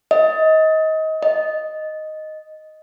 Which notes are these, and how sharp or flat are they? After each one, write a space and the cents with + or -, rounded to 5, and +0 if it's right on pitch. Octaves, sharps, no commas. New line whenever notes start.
D#5 +25
D#5 +0